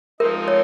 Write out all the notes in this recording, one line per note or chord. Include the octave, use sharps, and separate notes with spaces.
F3 G#3 C4 D#4 A#4
C#5